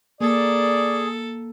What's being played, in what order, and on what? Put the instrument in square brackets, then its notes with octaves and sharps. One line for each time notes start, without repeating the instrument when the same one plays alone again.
[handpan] A#3 [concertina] G#4 [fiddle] A4 [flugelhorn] D5